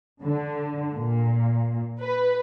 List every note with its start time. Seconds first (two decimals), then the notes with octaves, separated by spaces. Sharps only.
0.22 D3
0.93 A#2
1.99 B4